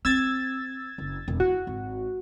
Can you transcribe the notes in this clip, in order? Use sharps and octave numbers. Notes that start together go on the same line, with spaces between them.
C4 E6 G#6 A6
F#1
E1
E4 F#4
G#1